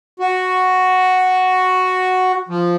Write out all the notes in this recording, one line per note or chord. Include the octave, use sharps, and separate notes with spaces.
F#4
F3